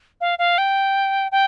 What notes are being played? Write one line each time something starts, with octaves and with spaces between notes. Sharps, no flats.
F5
F5
G5
G5